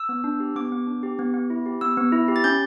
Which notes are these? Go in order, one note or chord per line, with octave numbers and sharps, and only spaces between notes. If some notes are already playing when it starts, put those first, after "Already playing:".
Already playing: E6
B3
D4
G4
B3 D6
B3
D4
G4
B3
B3
E4
G4
B3 E6
B3
E4
G4
A6
C#4 G6